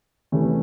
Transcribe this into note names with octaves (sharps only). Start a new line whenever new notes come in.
E2 C3 E3 A3 C#4